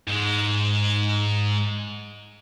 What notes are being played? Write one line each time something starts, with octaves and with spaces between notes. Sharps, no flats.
G#2 G#3